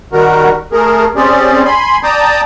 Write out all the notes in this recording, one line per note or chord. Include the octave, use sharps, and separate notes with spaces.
D#3 G3 F#4 A#4
A3 G#4 A#4
C4 C#4 G4 G#4 D5
G#5 B5 C6
D5 G5 A5 A#5 D6 D#6